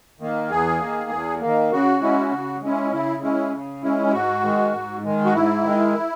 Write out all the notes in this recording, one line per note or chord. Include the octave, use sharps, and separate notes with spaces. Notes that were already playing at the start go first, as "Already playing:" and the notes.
D#3 A#3
E2 G#4
D#3 A#3
E2
D#3 A#3
C#3 F#4
G#3 C#4 E4
C#3
G#3 C#4 E4
C#3 E4
G#3 C#4 E4
C#3
G#3 C#4 E4
E4
G#2 F#4
D#3 G#3
G#2
D#3 G#3
F#4
G#2 E4
D#3 G#3